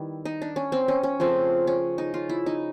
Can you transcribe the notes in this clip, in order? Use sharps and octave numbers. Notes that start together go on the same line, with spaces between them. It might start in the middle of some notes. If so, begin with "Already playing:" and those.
Already playing: D#3 G3 B3 E4
D#4
D4
C#4
C4
C#4
C#4
C#3 F3 A3 C4
C#4
D#4
F4
E4
D#4